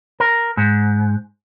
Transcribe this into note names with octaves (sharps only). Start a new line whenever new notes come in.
A#4
G#2